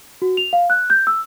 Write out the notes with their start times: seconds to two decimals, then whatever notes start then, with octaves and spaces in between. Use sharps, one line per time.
0.22 F#4
0.37 F7
0.53 F5
0.70 F#6
0.90 G6
1.07 E6